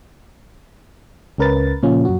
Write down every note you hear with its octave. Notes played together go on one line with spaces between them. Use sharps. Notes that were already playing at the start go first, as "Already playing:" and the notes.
C#2 C#4 A#4 B4 A6
A#2 C#3 F3 C#4 F4
F#2 F#4